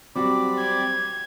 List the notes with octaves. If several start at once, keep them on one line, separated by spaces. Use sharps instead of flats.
F#3 G3 C4 F#4 D5 B5 D6
G#6